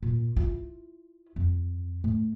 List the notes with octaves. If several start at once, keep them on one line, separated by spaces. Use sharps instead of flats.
A#2
E4 F4
F2
A2